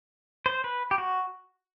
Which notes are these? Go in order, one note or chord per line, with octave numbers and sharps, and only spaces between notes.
C5
B4
G4
F#4